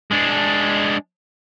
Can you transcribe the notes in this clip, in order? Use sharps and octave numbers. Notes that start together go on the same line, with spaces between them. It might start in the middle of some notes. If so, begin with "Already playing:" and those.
G#3 D4